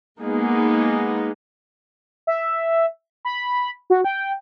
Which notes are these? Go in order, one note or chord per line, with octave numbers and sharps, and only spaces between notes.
G#3 A#3 B3 D#4 G#4
E5
B5
F#4
G5